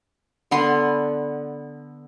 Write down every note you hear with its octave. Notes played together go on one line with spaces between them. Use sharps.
D3 B3 C6